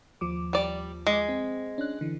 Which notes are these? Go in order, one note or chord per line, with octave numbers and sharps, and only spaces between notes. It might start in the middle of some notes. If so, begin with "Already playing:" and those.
D#2 F3 D6
G3 D5
G#3
C4
C#4 D4 F#6
D3 E3